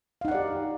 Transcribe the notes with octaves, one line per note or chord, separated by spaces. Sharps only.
D#4 G4 D5 F5 F#5